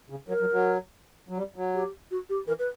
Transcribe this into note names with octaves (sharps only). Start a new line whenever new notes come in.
C#3
F#3 A#4
F#3
F#3
F#3
G3
F#3
G4
F#4
G4
E3 A#4
B4